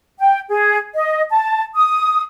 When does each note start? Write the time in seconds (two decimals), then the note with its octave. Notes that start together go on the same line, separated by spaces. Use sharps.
0.19 G5
0.49 G#4
0.95 D#5
1.30 A5
1.75 D#6